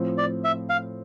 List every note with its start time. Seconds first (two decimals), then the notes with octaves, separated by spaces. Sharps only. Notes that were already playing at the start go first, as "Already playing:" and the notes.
Already playing: A2 F3 C4
0.18 D5
0.44 E5
0.69 F5